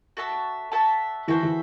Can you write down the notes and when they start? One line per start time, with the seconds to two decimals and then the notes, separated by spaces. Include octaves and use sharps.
0.17 F#4 A4 E5 A5
0.72 F#4 A4 E5 A5
1.28 E3 F#4 A4 C5 E5
1.43 E3